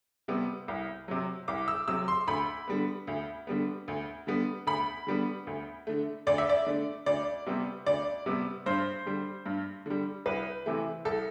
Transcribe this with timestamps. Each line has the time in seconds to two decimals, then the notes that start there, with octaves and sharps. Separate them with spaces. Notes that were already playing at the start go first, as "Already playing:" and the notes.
0.28 C3 G3 B3
0.68 C2
1.08 C3 F#3
1.48 C2 D6
1.68 E6
1.88 C3 F#3 E6
2.08 C6
2.27 D2 B5
2.68 D3 G3 B3
3.07 D2
3.47 D3 G3 B3
3.88 D2
4.27 D3 G3 B3
4.67 D2 B5
5.07 D3 G3 B3
5.47 D2
5.87 D3 A3
6.27 D2 D5
6.38 E5
6.49 D5
6.66 D3 A3
7.06 D2 D5
7.46 C3 G3 B3
7.86 D2 D5
8.26 C3 G3 B3
8.66 G2 C5
9.06 D3 G3
9.46 G2
9.86 D3 G3
10.26 C2 B4
10.66 C3 E3 A3
11.05 C2 A4